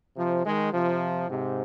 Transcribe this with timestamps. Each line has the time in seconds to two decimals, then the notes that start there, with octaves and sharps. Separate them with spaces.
0.17 C3 F3
0.45 D#3 G#3
0.73 C3 F3
1.29 G#2 C3